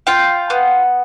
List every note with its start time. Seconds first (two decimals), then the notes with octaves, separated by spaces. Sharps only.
0.07 F4 G5
0.50 B3